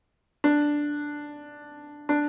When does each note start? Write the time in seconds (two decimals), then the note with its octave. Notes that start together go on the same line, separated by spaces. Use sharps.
0.44 D4
2.09 D4